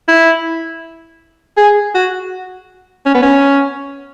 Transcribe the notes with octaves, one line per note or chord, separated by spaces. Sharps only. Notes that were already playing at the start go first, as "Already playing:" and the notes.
E4
G#4
F#4
C#4
B3
C#4